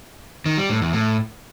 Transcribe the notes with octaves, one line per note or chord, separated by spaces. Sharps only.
D#3
G3
A2
E2
A2